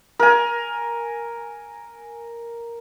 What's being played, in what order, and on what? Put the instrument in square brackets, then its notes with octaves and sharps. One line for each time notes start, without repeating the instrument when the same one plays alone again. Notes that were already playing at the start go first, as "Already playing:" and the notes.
[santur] A#4 G#5